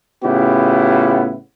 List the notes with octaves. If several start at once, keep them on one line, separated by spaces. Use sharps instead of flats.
A2 C#3 B3 E4 F4 G4